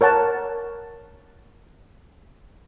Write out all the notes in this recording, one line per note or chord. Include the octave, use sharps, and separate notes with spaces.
A#4 C#5 F#5 A5